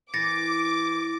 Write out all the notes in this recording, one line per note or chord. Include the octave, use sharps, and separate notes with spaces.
E3 D6 A6 A#6 C#7